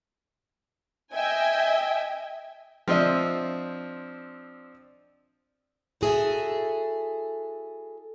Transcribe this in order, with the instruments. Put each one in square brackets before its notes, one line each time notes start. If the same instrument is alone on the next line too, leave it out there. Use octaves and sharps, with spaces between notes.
[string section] D#5 E5 G5 G#5
[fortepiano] F3 C4 D4 D#5 E5
[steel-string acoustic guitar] E4 F#4 G#4 A4 E5